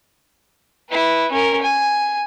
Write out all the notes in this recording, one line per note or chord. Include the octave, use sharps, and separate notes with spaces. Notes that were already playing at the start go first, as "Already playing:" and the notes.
E4 B4
C#4 A#4
G#5